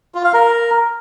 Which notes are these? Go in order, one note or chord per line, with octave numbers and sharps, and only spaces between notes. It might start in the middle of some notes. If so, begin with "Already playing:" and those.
F4
F5
A#4